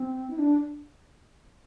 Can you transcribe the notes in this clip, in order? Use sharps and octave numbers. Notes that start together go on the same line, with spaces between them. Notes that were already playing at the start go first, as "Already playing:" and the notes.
Already playing: C4
E4
D4